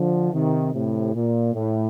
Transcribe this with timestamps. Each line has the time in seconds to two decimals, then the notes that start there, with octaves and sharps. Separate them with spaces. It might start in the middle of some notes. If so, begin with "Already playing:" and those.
Already playing: D3 F3
0.33 C3 D#3
0.73 A2 C3
1.14 A#2
1.54 A2